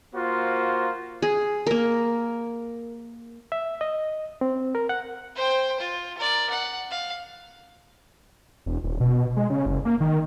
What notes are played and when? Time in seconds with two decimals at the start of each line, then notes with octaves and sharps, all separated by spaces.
0.14 A#3 F4 F#4 C5
1.22 G#4
1.67 A#3 A#4
3.52 E5
3.81 D#5
4.41 C4
4.75 A#4
4.89 F#5
5.35 C5 G5
5.80 F4
6.18 A#4 D5
6.50 F#5
6.91 F5
8.66 E1
8.84 D#1
9.00 B2
9.37 G#3
9.50 C#3
9.66 F#1
9.85 A#3
10.00 D#3